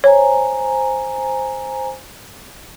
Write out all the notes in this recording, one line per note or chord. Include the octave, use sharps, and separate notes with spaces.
C5 C#5 G#5 A#5